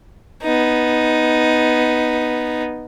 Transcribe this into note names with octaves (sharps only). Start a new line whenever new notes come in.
B3 D#4